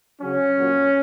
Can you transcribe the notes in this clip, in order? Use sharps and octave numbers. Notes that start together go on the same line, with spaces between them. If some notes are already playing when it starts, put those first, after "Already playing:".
C#3 F#3 C#4
A#2 F#3